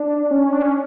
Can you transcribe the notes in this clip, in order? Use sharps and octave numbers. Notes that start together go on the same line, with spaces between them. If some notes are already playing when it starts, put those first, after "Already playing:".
Already playing: D4
C#4
D4
C#4